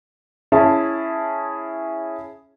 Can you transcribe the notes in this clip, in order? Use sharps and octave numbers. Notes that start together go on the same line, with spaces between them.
C#4 E4 G#4 A5